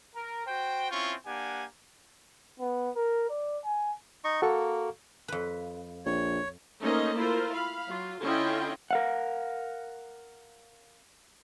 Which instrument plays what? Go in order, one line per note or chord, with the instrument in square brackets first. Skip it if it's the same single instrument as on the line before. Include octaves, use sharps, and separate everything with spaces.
[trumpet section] A#4
F#4 C5 G5
C4 C#4 E4 F4 C#6
A#3 D4 G4 F#5 G#5
[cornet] B3
A#4
D5
G#5
[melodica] D#4 D#5 C#6
[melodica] A#3 [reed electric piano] F#4 A4 C#6
[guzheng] F2 B4
[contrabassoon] A#1 [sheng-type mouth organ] C#5
[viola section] A3 A#3 C#4 D#4 C5 D#5
E4 F4 A#4 C5
F5 B5
F#3 F4
D3 C#4 E4 F4 D#5 G5
[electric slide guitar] A#4 F5 F#5